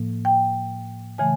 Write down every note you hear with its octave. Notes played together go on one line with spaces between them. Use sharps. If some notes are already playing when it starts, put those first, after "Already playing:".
Already playing: A2 F3 A#3
G5
C#3 E3 A3 G#5